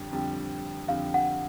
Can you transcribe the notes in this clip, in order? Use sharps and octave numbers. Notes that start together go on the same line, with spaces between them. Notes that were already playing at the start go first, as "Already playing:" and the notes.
Already playing: F2 D3 G3
F2 D3 G3 C4
F2 D3 G3 C4 F5
F#5